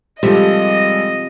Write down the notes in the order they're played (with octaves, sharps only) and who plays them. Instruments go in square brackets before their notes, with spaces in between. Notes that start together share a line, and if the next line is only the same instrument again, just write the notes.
[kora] C3 F3 E5 [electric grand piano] G3 G#3 A4 [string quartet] D#5